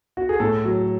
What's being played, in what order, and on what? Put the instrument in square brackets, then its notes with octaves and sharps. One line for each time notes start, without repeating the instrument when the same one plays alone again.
[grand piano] F#4
G#4
A2 A4
F#3